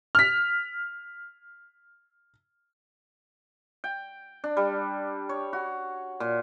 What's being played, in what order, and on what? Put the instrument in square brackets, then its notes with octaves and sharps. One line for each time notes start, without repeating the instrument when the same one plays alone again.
[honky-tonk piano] F6 B6
[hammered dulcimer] G5
D4
G3
C#5
F#4
A#2